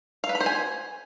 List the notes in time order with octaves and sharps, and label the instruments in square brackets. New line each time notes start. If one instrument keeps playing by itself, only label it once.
[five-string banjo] F5
B4
B5
C5
G#5